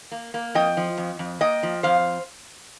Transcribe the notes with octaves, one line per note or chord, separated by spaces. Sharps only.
A#3
A#3
F2 D#5 G5
F3
F2
F2
A#3 D#5 G5
F3
F2 C5 F5